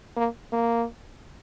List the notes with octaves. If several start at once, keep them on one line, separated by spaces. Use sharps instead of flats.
A#3
A#3